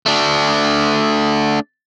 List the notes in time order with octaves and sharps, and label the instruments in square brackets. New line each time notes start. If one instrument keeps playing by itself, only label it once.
[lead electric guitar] A3 D4